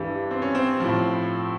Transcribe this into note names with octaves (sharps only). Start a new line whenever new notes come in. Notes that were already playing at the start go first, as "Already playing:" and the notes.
Already playing: G2 E3 G3
C4
C#4
C4
A2 F3